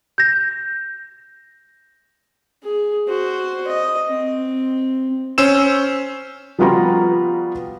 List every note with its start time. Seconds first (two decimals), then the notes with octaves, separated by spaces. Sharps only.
0.18 G6 A#6
2.64 G#4
3.08 F#4 C5
3.67 D#5
4.08 C4
5.38 C#4 C5 E6 E7
6.59 F3 G3 B3 F4 F#4 A#5